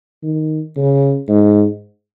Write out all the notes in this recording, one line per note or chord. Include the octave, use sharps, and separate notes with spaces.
D#3
C#3
G#2